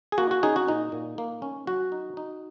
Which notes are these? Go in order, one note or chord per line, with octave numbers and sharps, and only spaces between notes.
G#4
A#3 F#4
F#4
C#4 D#4 G#4
F#4
A#2 D#4
A#2
A#3
C#4
F#3 F#4
D#4
D#4